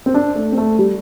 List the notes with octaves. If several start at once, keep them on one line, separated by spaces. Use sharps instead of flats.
C4
D4
A3
C4
A3
G3